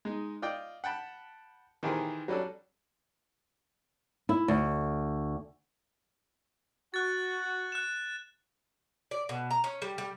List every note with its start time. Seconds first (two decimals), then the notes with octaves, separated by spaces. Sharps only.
0.05 G#3 D#4
0.42 F4 D5 D#5 G5
0.84 F#5 G5 A5 B5
1.83 D#3 E3 G4 G#4 A#4 C5
2.28 F#3 G3 C#4 D4 A4
4.29 E4
4.48 D2
6.94 F#4 F#6 A6
7.72 F#6 E7
9.11 D5
9.29 B2
9.51 A#5
9.64 C#4
9.82 G3
9.98 G3